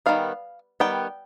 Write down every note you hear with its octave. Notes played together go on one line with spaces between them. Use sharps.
D#3 G3 B3 F5
D#3 G3 B3 G5